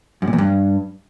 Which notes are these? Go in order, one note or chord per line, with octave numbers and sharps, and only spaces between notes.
F#2
A#2
E2
G2